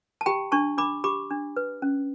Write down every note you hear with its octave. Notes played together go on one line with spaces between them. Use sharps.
A5
G4 G5 B5
D4 A5 C#6
D4 B5 D6
G4 B5 D6
D4
B4
C#4